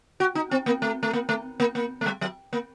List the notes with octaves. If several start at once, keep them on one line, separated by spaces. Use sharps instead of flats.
F#4
D#4
C4
A#3
A3
A3
A#3
A3
A#3
A#3
A3
G3
F#3
A#3